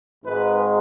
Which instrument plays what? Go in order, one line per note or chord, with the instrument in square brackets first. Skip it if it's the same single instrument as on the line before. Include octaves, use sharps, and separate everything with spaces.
[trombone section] G#1 G#2 D#3 G#3 B4